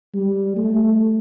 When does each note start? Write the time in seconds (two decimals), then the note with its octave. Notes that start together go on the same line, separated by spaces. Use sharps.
0.14 G3
0.57 A3